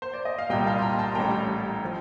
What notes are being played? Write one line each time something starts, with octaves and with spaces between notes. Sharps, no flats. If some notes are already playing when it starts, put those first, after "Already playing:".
C5
D5
D#5
F5
C2 A#2 G3 D#5 G5
F5 A5
C6
G5 A#5
A5 C6
A1 A2 G3 G5 A#5
F3